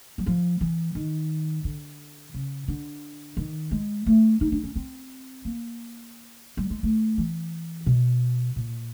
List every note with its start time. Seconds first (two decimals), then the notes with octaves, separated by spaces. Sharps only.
0.18 F#3
0.26 F3
0.61 E3
0.95 D#3
1.64 D3
2.34 C#3
2.68 D3
3.37 D#3
3.71 G#3
4.06 A3
4.41 D#4
4.52 D4
4.63 C#4
4.76 C4
5.45 A#3
6.57 G3
6.70 G#3
6.83 A3
7.18 E3
7.86 B2
8.56 A#2